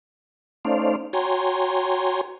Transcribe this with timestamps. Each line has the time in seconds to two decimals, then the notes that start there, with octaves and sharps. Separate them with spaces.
0.65 A3 C#4 D#4 C5 D5 F5
1.13 F#4 C#5 G5 G#5 A#5 C6